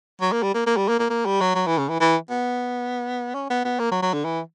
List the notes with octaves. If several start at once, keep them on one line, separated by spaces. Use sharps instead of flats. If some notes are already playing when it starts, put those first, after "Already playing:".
F#3
A#3
G3
A#3
A#3
G3
A#3
A#3
A#3
G3
F#3
F#3
E3
C#3
E3
E3
B3
C#4
B3
B3
A#3
F#3
F#3
D3
E3